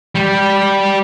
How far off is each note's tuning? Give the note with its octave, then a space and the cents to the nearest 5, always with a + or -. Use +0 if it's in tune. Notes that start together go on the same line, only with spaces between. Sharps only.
G3 -5